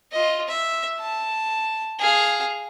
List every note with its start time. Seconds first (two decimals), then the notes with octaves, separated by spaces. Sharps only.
0.12 F4 D#5
0.48 E5
1.00 A5
1.99 G#4 F5